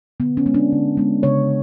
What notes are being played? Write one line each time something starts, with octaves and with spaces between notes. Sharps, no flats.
D3 B3
C#4
G#3 B3
D4
D3
G#3 B3
C#3 C#5